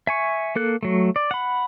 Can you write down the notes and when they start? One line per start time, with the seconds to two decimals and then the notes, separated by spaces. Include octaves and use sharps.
0.07 E5 G#5 C#6
0.56 A#3 A4 F#6
0.83 F#3 A3
1.16 D5
1.31 F#5 B5